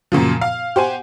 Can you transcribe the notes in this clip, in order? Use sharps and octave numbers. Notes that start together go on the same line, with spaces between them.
F#2 A#2 C#3 F3
F5
G4 C5 F#5 G#5